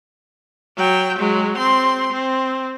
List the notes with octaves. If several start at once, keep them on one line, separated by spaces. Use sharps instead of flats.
F#3 G5
F#3 G#3
C4 C6
C4